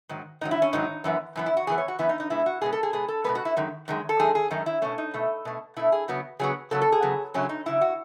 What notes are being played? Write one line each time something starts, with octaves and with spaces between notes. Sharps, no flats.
G#2 D#3 F#3
G#2 D#3 F#3 D#4
E4
C#4
G#2 D#3 F#3 D#4
F#2 E3 B3
F#2 E3 B3
E4
F#4
F#2 E3 B3 G#4
C#5
F#4
F#2 E3 B3 E4
D#4
D#4
B2 G#3 B3 E4
F#4
B2 G#3 B3 G#4
A4
G#4
B2 G#3 B3 G#4
A4
B2 G#3 B3 B4
F#4
E4
F#2 D#3 G#3
F#2 D#3 G#3
A4
F#2 D#3 G#3 G#4
G#4
F#2 D#3 G#3 D#4
E4
B2 A3 C#4
D#4
B2 A3
B2 A3
B2 A3 E4
G#4
C#3 F#3 B3 F#4
C#3 F#3 B3 G#4
C#3 F#3 B3 A4
A4
G#4
C#3 F#3 B3
F#2 C#3 F#3 C#4
D#4
F#2 C#3 F#3 E4
F#4